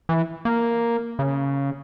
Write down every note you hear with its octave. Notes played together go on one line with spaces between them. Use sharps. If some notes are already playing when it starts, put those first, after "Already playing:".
E3
A#3
C#3